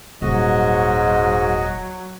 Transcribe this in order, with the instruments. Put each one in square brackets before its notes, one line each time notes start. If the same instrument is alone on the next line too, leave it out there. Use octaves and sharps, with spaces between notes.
[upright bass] D#1 [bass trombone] G#2 [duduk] F#3 [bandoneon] F#4 D#5